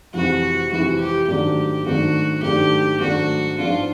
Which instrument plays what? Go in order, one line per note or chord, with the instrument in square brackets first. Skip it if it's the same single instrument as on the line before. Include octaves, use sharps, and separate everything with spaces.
[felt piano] F2 C3 E3 G#3 [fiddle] F#4
[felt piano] F2 C3 E3 G#3 [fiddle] F#4
[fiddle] G4
[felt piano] G#2 D#3 F#3 A3 D4 [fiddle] G4
[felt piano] G#2 D#3 F#3 A3 D4 [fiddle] F#4
[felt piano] G#2 D#3 F#3 A3 D4 [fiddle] G4
[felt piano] G#2 D#3 F#3 A3 D4 [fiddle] F#4
[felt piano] G#2 F3 G#3 B3 D4 [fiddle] F4